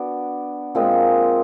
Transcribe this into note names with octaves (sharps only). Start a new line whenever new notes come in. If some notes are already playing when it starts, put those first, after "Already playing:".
Already playing: B3 D4 F#4
A#2 F3 G#3 C4